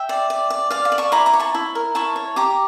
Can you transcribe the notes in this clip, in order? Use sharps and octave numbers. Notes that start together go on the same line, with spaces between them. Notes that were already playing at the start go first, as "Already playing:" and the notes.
Already playing: E5 G5
D5
D5
D5
D5 F5
F5
D5
A5 C#6
E4 A#5 D6
A#5 D6
C#5
A5 C#6
E4
A#4
E4 A5 C#6
C#5
G4 A#5 D6